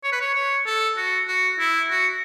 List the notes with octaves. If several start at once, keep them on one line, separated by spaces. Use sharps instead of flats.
C#5
B4
C#5
C#5
A4
F#4
F#4
E4
F#4